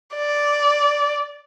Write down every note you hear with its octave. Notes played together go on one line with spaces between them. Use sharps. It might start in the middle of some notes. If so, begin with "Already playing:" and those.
D5